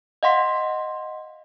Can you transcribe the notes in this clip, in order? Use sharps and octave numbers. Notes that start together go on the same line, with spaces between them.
D#5 F5 F#5 C6 B6